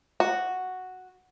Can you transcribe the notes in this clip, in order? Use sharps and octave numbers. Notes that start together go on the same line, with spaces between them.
F#4